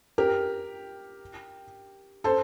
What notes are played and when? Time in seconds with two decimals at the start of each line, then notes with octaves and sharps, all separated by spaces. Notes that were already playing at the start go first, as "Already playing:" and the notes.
0.18 G4 A#4
2.24 A4 C5